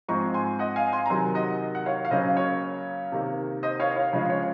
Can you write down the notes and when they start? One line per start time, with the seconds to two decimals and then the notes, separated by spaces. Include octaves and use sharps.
0.08 G#2 F3 G#3 C4 A#5 C#6
0.34 G#5 C6
0.59 D#5 F#5
0.76 F5 G#5
0.93 G#5 C6
1.06 A#5
1.10 C3 D#3 F#3 G#5 C6
1.35 D#5 F#5
1.75 F#5
1.86 C#5 F5
2.05 F5
2.11 C#3 F#3 A#3 C#4 C5 D#5
2.37 C#5
3.12 C3 D#3 A#3
3.63 C5 D#5
3.80 C#5 F5
3.96 C#5 F5
4.13 C#3 F3 G#3 C#4 C#5
4.30 C#5